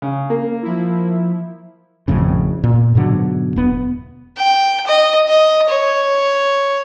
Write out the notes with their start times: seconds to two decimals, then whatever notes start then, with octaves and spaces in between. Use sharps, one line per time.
0.02 C#3
0.30 A#3
0.62 F3 E4
2.08 G#1 F2 A2 C#3
2.64 A#2
2.95 G#2 B2 D3 F#3
3.56 E1 B3
4.37 G5
4.87 D#5
5.28 D#5
5.69 C#5